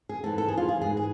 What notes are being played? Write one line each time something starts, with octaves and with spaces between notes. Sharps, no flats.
G#4
G#2 E3 A4
A4
G#4
F4
G#4
G#2 E3 G#4
G#4